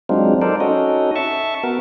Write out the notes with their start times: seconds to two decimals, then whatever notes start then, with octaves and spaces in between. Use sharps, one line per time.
0.09 F#3 G#3 C4 D4 D#4 F4
0.41 D#4 A4 A#4 C5 D5
0.60 C#4 D#4 F#4 A4 D#5
1.16 E5 A5 C#6
1.63 B3 F#4 A#4